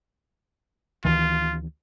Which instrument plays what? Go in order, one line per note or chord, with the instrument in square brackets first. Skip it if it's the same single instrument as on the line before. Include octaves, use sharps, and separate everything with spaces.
[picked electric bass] D2 D#3 E3 [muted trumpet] F4